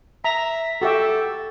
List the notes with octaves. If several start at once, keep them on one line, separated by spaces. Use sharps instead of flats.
E5 A#5
F#4 G4 A4 E5